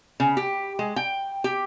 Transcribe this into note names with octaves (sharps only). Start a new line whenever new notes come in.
C#3
G4
G#3
G5
G4